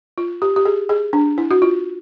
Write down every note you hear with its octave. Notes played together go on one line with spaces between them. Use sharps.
F4
G4
G4
G#4
G#4
D4
E4
F#4
F4